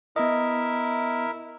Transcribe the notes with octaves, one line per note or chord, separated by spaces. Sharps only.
B3 E4 A#4 D#5 E5